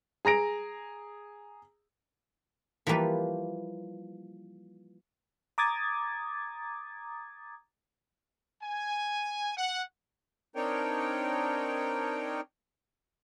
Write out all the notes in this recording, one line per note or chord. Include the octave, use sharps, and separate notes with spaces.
G#4 A#5 A#6 D7
E3 F3 G3 A#3 B4
A#5 D6 D#6 G#6 A6
G#5
F#5
C4 D4 D#4 A#4 C#5 G5